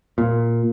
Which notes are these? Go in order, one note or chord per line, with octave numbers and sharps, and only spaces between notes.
A#2